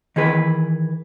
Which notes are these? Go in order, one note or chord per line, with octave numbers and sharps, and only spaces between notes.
D#3 E3 G#4 B4